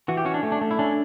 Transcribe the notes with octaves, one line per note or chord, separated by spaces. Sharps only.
E3 F#4
G4
C#4 F#4
D4
A3
D4
A3
E4
C#4 D4